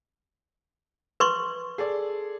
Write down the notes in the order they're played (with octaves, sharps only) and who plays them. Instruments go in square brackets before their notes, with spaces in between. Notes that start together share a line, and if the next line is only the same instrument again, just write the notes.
[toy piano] B4 C6 C#6
[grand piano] G#4 A4 D5